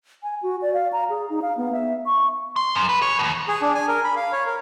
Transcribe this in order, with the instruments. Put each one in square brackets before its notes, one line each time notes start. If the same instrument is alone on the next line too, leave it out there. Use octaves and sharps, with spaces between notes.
[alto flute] G#5
F#4
D5
F5
A#5
G#4
D#4
F5
B3
E5
C#6
[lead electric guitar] C6
F#2
B4
C#5
D#2 B2
[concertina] G#4
D4
G#5
A#4
B5
F5
C#5
A#4